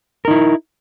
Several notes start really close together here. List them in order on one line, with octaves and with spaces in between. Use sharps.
A#4 D#4 E4